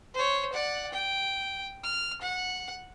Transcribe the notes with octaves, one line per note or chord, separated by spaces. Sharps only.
C5 C#5
D5 F#5
G5
F6
F#5